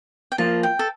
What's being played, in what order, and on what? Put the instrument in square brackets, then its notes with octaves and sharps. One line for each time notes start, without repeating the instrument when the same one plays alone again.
[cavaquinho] G5
[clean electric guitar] F3 A#3 F4 [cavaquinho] A5
[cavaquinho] G5
A4